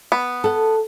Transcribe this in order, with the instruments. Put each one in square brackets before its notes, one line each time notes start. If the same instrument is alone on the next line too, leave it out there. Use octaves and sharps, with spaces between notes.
[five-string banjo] B3
[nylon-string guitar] A4 F#5